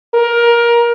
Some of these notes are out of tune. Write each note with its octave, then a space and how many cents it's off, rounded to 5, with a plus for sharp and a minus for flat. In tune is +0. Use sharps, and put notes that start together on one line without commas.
A#4 +20